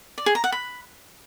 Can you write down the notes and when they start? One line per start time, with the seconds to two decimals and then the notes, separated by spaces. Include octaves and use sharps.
0.18 D5
0.26 G#4
0.35 A#5
0.44 F#5
0.52 B5